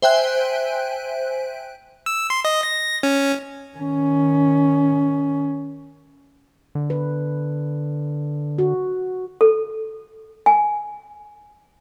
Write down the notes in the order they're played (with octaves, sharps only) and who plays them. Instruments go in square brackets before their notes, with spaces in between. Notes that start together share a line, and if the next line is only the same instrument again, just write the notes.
[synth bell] C5 E5 G5 G#5 F#6
[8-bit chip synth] E6
C6
D#5
A#6
C#4
[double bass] D#3 C#4
[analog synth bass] D3
[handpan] B4
F#4
[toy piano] A4
G#5